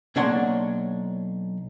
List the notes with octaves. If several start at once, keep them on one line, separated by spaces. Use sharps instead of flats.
B1 A#3 D4 C#5 F#5 C6